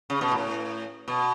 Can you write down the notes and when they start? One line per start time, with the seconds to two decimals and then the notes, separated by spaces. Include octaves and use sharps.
0.10 C#3
0.21 B2
0.32 A2
1.08 B2